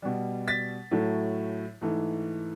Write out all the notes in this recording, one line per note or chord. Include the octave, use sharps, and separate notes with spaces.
B2 G3
A6 B6
A2 F#3 A3
G#2 E3 A3